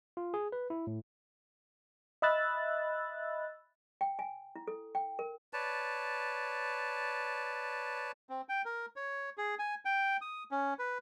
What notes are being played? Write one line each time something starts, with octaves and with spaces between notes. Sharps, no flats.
F4
G#4
B4
E4
A2
D#5 E5 B5 E6 F#6 A6
G5
G#5
E4
A4
G5
A#4
B4 C#5 D5 A5
C4
G5
A#4
C#5
G#4
G#5
G5
D#6
C#4
B4